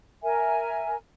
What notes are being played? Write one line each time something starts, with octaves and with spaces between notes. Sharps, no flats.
A#4 E5 G#5